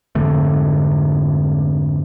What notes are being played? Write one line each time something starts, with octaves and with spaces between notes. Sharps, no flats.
F2 G#2 D3 A3